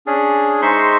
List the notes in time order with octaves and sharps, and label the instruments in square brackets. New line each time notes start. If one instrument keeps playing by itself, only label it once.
[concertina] C#4 D4 G#4
G#3 D#4 C5 E5 C6 C#6